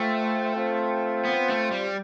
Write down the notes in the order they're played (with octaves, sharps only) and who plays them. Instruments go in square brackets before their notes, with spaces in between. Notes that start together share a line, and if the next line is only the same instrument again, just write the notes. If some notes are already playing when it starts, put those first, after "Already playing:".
Already playing: [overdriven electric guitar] A3 [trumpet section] F4 C5 E5 G5
[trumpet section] C4 F4 C5 G5
[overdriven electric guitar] B3
A3
G3